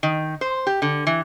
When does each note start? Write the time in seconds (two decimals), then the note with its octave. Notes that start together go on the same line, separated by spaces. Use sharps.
0.03 D#3
0.41 C5
0.67 G4
0.82 D3
1.07 E3